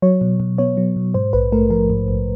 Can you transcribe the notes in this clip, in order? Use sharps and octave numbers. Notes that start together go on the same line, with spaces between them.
F#3 C#5
B2
B2
B3 C#5
F#3
B2
G#2 C5
A#1 B4
A3 A#4
F3 A#4
G#2
A#1